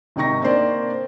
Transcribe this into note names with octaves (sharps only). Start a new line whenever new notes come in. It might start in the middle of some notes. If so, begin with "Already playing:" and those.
G#1 C3 D#4 G5 C#6 A#6
A#3 C4 D4 C5 D5